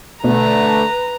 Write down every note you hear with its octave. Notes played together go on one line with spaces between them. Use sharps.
B2 D3 A3 B4 A#5